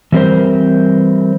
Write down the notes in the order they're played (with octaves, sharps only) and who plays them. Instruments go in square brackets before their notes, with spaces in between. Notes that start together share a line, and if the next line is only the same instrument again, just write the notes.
[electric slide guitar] E3 G3 C4 A#4 C5